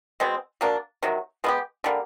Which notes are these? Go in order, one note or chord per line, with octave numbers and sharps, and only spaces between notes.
B2 G#3 C4
F#3 A#3 D4
C3 D#3 F#3
G#3 B3 E4 G4
D3 G3 A#3